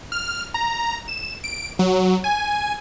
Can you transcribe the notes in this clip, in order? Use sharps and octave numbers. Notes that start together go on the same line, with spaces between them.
F6
A#5
E7
D7
F#3
G#5